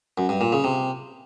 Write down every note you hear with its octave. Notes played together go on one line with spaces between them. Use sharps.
F#2
G2
A#2
C#3
C3